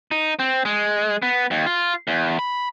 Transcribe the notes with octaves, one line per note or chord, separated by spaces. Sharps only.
D#4
C4
G#3
B3
D#2
F4
E2
B5